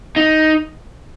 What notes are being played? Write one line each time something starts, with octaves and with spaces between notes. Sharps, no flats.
D#4